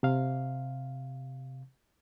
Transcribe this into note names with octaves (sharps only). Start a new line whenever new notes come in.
C3 F5